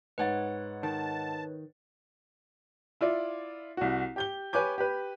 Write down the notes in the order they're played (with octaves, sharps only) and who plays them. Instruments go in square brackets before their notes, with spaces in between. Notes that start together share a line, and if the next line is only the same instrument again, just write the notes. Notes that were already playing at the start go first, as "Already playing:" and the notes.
[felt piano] G#2 F#5 A6 [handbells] B4 C#5
[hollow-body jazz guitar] D#3 [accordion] A5
[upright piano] E4 F4 D5
C2 F#4
G4 G6 G7
G4 B4 C#5 G#5 D6 G6
G4 B4